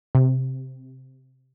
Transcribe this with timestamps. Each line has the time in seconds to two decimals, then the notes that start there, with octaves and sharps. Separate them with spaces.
0.15 C3